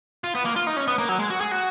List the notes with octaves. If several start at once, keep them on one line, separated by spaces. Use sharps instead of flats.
F4
B3
A#3
F4
D#4
C#4
B3
A#3
F#3
G#3
F#4
G#4
F#4